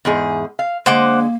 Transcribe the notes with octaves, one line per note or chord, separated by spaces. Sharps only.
E2 G#2 G#4
F5
D3 G#3 A#3 C5 F#5 D6